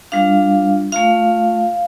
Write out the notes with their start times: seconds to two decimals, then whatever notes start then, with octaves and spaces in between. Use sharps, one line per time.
0.12 G3 D4 F4 F5
0.92 A3 F4 F5